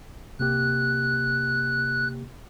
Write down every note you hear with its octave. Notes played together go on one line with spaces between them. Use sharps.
C3 A#3 G4 F#6